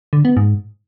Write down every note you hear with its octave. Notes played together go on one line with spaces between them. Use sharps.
D3
B3
G#2